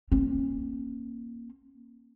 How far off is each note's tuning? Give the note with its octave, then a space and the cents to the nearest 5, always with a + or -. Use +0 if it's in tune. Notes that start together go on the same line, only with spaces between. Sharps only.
A#3 +5 C#4 -30